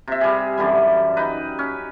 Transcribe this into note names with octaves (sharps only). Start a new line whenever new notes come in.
C3 E5
G3 G#4
F#2 D3 E3 G3
D#4 B4
C#4